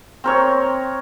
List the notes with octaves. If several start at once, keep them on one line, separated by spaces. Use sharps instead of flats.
C4 A#4 C#5